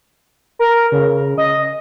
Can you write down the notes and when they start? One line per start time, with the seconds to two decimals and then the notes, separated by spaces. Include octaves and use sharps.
0.59 A#4
0.92 C#3
1.38 D#5